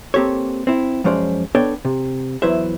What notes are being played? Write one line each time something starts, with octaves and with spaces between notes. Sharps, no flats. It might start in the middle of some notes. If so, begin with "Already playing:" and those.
A#3 C4 G4 A4 C#5
C4 E4
F#2 F3 G#3 C#4 C5 D5
B3 D4 A4 C#5 G5
C3
E2 F#3 E4 B4 C5 E5